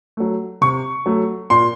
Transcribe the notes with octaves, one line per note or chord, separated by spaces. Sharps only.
F#3 A3
C3 C#6
F#3 A3
A#2 C6